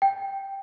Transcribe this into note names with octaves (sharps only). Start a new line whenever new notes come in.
G5